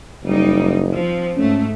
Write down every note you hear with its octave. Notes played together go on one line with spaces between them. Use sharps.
F#1 G3 D#4
F3 C4
G#2 A3 C#4